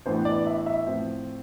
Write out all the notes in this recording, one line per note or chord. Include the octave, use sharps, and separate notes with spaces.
A2 E3 B3 D4 C5
D5
E5
E5
A2 F3 C4